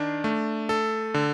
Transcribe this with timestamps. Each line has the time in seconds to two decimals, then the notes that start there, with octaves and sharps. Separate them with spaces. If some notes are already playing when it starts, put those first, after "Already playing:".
Already playing: D#3 D4
0.24 A3
0.69 A4
1.14 D3